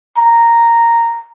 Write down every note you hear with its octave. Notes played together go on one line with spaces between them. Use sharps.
A#5